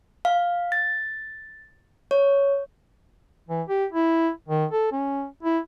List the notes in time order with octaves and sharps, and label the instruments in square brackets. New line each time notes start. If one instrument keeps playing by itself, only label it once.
[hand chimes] F5
A6
C#5
[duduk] E3
G4
E4
D#3
A4
C#4
E4